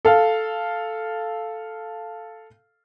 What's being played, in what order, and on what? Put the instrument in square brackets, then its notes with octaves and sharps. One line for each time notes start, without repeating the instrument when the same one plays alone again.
[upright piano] A4 F5